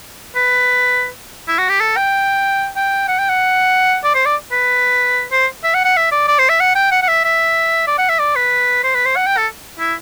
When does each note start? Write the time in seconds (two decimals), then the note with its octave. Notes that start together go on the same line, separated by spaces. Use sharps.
0.36 B4
1.48 E4
1.58 F#4
1.69 G4
1.80 A4
1.97 G5
2.76 G5
3.08 F#5
3.19 G5
3.29 F#5
4.04 D5
4.14 C5
4.26 D5
4.52 B4
5.32 C5
5.64 E5
5.74 F#5
5.85 F#5
5.96 E5
6.12 D5
6.28 D5
6.39 C5
6.49 E5
6.60 F#5
6.75 G5
6.91 F#5
7.02 F#5
7.08 E5
7.24 E5
7.87 D5
7.98 F#5
8.09 E5
8.19 D5
8.36 B4
8.84 C5
8.95 B4
9.05 C5
9.16 F#5
9.27 G5
9.37 A4
9.80 E4